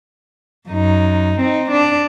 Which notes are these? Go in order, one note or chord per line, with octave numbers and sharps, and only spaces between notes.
F#2 D#4
C4 D#4
D4